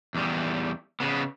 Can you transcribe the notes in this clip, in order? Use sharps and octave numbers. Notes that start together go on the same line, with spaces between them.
E2 G3
C#3 B3